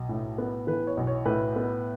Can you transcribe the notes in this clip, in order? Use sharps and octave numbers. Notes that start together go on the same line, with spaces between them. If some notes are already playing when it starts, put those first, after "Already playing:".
Already playing: B1
A2
B3
E3 B4
C#5
B1
C#5
A2 B4
B3